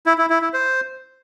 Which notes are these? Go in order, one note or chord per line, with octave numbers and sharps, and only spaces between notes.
E4
E4
E4
E4
C5